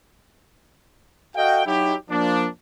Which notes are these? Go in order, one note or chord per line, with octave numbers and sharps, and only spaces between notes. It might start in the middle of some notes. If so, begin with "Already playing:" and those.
F#4 A4 D#5 F5 G5
F#3 D#4 E4 G4
F3 A#3 D4